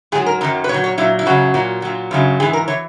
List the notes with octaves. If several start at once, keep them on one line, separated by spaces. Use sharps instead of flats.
G#2 F#3 G#4
A#4
F#2 D#3 F#3 A#4
B4
A#2 C#5
F#3
C#5
A#2 F#3 E4
E4
F#2 C#3 F#3 F#4
A#2 F#3
A#2 F#3
F#2 C#3 F#3
G#2 E3 G#4
A#4
E3 C#5